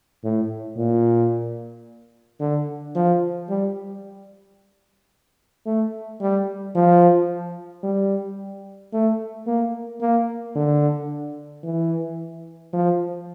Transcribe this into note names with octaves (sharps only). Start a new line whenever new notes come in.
A2
A#2
D3
F3
G3
A3
G3
F3
G3
A3
A#3
A#3
D3
E3
F3